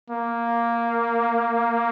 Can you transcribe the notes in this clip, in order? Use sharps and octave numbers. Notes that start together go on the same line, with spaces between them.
A#3